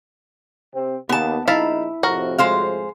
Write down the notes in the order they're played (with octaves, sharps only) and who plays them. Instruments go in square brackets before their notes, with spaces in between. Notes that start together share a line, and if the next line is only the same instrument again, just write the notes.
[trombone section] C3 C4
[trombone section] D#2 [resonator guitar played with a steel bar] B3 A5
[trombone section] A#1 D#4 [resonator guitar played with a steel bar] E4 [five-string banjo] F5 A5
[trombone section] F2 A2 C3 [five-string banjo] F#4 A#4
[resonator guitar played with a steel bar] G#3 C5 F5